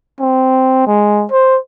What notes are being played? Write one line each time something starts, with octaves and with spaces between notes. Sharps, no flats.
C4
G#3
C5